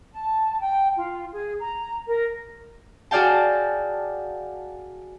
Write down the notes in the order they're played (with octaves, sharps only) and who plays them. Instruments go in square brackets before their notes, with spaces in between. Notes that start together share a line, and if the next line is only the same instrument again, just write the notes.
[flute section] A5
G5
F4
G#4
A#5
A#4
[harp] F#4 G#4 D5 F5 G5 A5